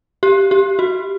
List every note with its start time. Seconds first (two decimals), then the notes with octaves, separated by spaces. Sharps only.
0.23 G4
0.51 G4
0.79 F#4